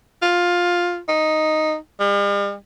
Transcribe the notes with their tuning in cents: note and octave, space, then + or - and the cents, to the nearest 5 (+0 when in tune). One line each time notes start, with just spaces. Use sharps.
F4 +10
D#4 +0
G3 +45